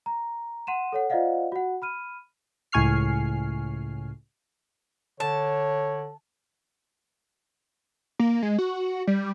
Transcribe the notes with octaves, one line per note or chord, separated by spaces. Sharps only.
A#5
F#5 C6 D#7 E7
A4 C#5 F#5
F4 C5 D5 D#5 F5 F#5
F#4 F#5
B5 F6 D#7
C#2 A2 G#5 C#6 F6 C7
D3 C#5 A5
A#3
G#3
F#4
G3